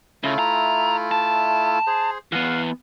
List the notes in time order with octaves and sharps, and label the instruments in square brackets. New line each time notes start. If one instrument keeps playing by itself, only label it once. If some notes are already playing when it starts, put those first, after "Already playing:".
[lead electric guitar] C#3 [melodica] A3 E4 F4
[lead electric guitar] A#5
A5
[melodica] G#4 C5
[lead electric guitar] E3 B3 [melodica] F5 F#5